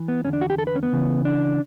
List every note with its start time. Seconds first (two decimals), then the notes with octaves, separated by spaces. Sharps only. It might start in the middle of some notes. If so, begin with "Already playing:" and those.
Already playing: E3
0.08 B3
0.24 E2 D3 C#4
0.33 D4
0.41 F#4
0.50 G4
0.58 A4
0.67 B4
0.75 C#4
0.83 B3
0.92 C#2 C#3 E3
1.25 D4